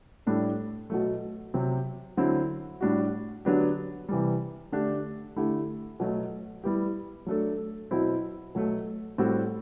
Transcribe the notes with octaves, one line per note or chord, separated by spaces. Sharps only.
A2 G3 D4 A4
B2 F#3 A3
C3 F#3 C4
D3 F#3 C4 E4
A2 G3 D4 F#4
D3 F#3 B3 D4 G4
C3 E3 G3
D3 A3 D4 G4
D3 A3 E4 G4
B2 F#3 A3
G3 B3 E4 G4
F#3 A3 D4 A4
B2 F#3 C4 E4
B2 F#3 A3
A2 G3 C4 F#4 A4